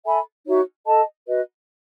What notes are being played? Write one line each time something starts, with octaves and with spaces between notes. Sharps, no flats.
A4 E5 G#5 B5
D#4 F#4 C#5 E5
A4 D#5 A5
F#4 B4 D#5